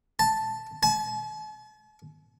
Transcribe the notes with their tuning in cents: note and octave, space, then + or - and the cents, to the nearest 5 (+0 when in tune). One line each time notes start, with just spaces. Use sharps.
A5 +0
A5 -45